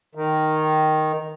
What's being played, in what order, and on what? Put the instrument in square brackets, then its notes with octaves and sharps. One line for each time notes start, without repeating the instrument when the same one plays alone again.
[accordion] D#3